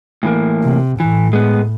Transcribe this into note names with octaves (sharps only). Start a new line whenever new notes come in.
A2 E3 A#3
C3
A2 E3
G#3 B3